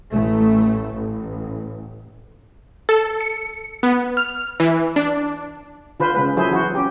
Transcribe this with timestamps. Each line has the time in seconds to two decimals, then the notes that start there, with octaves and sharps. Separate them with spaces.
0.12 A1 A3
0.94 A1
2.89 A4
3.21 C#7
3.83 B3
4.17 F6
4.60 E3
4.96 D4
6.00 D3 F4 B4 C5
6.14 C#3 G#3 B4
6.36 F3 F#3 E4 G#4 A4 C5
6.51 E3 F#4 C5
6.75 C#4 G4